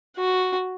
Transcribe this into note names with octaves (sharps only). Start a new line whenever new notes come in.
F#4